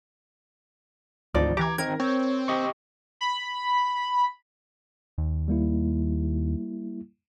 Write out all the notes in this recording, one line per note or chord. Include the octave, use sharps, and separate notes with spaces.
G#1 D2 F3 D#4 D5
E3 G4 A#5 D6 G#6
D#3 C4 D#4 A#4 G#6
C4 C#5
G4 D#5 C#6
B5
D#2
G3 A#3 E4